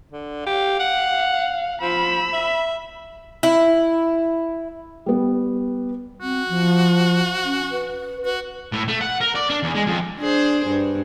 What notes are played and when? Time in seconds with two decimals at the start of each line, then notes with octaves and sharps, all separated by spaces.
0.12 D3
0.46 G4 F5
0.80 F#5
1.82 F3 B5 E6
2.33 E5
3.43 E4
5.06 G3 B3
6.20 C4 F#4
6.49 F3
7.45 C#4
7.71 B4
8.25 F#4 B4
8.72 A2
8.88 A3
9.01 F#5
9.21 A#4
9.35 D5
9.50 D4
9.63 E2
9.75 G#3
9.87 F2
10.19 D4 G#4 C5
10.66 G2